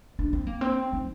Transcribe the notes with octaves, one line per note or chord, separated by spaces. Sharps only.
D4
C4
A#3
C4
D#4